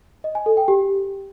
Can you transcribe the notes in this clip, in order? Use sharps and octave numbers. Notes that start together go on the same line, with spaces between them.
D#5
G#5
A4
G5
G4